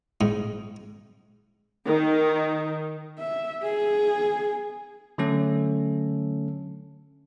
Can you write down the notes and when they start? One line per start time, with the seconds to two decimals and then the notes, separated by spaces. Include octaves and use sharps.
0.21 G#2
1.86 D#3
3.19 E5
3.63 G#4
5.18 D3 F#3 A3 C#4 A4